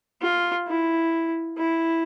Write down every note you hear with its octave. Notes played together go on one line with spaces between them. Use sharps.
F4
E4
E4